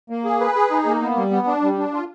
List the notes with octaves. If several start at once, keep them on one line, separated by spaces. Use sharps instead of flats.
A#3
G#4
B4
G#4
D#4
A#3
B3
G3
B3
D4
G3
D4
F4